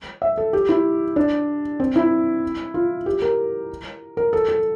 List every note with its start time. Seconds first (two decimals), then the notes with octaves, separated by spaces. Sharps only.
0.22 E5
0.38 A4
0.53 G4
0.69 E4
1.16 D4
1.80 C4
1.96 E4
2.74 F4
3.06 G4
3.22 A#4
4.17 A#4
4.33 A4
4.48 A4